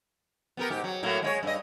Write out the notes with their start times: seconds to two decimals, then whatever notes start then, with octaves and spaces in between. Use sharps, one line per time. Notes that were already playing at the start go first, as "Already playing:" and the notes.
0.57 B3 G4 A#4
0.70 G#2 G4
0.84 F#3
1.03 A2 F#3 A#3
1.22 G#3 F4 C#5
1.43 G2 D#5